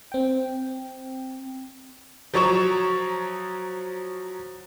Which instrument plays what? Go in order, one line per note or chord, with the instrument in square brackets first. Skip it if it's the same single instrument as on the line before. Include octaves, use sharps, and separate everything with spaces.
[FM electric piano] C4 G5
[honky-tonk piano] F3 F#3 C#5 A#5 C#6 E7